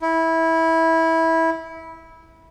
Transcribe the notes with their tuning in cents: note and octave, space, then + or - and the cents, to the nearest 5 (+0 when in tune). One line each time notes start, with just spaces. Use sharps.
E4 -15